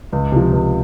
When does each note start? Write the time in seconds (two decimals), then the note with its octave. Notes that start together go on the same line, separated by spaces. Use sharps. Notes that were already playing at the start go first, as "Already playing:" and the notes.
0.12 C#2
0.32 C3 F3
0.53 C#2